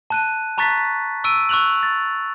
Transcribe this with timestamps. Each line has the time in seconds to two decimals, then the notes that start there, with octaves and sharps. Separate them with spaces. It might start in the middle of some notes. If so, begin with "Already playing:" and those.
0.10 A5 F#6 D#7
0.58 A5 A#5 C#6 F#6 A6 B6
1.24 C#6 E6 D7 D#7
1.49 C#6 E6 F#6 F7 F#7
1.83 A6